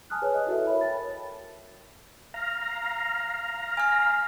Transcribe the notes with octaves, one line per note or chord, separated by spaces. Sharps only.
G#5 A5 D#6 F6 F#6
G#4 B4 C#5 G#5
D#5
E4 F#4 A4 B4 E5
A#4 C#5 E5 B5
G5 A5 A6
F5 A#5
G#5 F6